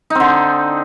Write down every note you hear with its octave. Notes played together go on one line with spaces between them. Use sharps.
D3 C4 D#4